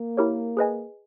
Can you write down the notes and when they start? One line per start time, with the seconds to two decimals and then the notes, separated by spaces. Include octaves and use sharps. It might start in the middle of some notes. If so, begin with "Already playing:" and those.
Already playing: A#3
0.17 E4 G4 A#4 C#5
0.57 G#4 B4 D#5 G#5